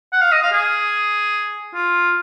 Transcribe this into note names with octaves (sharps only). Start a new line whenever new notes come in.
F#5
F5
D#5
F5
G#4
F4